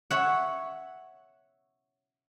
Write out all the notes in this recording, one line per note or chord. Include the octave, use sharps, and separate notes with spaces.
C#5 E5 F#5